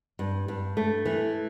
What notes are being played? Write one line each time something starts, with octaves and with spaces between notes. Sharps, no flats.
G2
G2
A3
E3